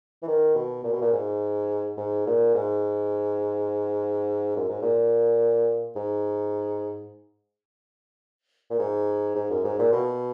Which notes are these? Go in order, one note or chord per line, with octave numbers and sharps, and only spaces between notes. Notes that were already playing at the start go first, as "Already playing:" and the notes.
E3
D#3
B2
A#2
B2
A#2
G#2
G#2
A#2
G#2
F#2
G#2
A#2
G#2
A#2
G#2
G#2
F#2
G#2
A#2
B2